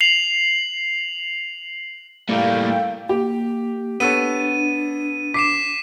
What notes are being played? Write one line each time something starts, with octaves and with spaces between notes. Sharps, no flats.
C7 F7 F#7
A2 G3 A3 A#3 F5 G5
A#3 G4
B3 D4 A4 C#5 D#7
D6 B6 C7 E7